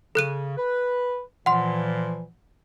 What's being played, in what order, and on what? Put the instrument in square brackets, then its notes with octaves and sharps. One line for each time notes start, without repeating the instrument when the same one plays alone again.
[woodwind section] C#3 [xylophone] A4 F#6 D#7
[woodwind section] B4
[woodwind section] A#2 E3 F3 [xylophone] F#5 C6